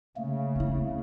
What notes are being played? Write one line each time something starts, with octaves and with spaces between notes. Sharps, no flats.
C#3 A3 A#3
C4 E4